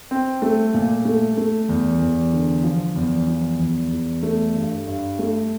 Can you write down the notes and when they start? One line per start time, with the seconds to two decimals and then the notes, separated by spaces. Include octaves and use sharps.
0.11 C4
0.42 A3
0.74 A#2
1.05 A3
1.37 A3
1.69 E2
2.00 E2
2.33 D3
2.64 F3
2.96 E2
3.28 F3
3.60 E2
3.91 E2
4.23 A3
4.55 G2
4.87 G2
5.19 A3